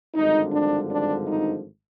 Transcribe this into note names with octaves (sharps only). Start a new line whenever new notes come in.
G#1 G2 D3 F3 D#4
D4
D4
D#4